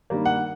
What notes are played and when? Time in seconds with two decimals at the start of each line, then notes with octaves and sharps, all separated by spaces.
0.10 G2 D#3 G3 A#3
0.25 F#5